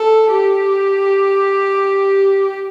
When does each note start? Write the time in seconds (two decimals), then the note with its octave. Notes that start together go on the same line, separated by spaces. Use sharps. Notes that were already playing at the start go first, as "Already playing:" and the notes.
Already playing: A4
0.33 G4